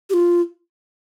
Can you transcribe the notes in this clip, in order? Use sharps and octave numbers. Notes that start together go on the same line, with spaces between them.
G4
F4